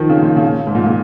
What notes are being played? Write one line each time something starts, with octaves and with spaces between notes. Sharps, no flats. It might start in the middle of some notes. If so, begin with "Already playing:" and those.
Already playing: D#3 F3
C#3
A#2
C#3
G#2
A#2
A#2